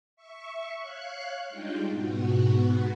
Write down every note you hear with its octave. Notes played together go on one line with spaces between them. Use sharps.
E5 C#6
C#5 F5 F#6
G3 G#3 D4 D#4 F4 G5
G#2 B2 B3 F#4